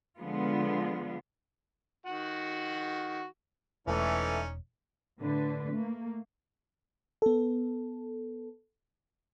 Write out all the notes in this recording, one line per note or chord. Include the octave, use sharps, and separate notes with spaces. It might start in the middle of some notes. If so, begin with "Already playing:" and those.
D3 F3 G#3 B3 F4
D#3 F#4 F#5
E1 E3 A3 C#4 D#4 D5
A2 D3 D4 B4
A3 A#3
B3 A4